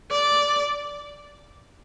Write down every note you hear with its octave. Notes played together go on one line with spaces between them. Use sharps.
D5